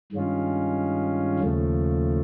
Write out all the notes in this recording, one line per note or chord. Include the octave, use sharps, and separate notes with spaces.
G2 D#3 G#3 C#4 F4
D#2 C#3 F3 A3